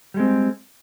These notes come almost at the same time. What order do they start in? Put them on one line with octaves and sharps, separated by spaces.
G3 G#3 C4